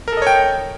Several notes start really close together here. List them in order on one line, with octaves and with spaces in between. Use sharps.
A#4 A4 D#5 C#5 G5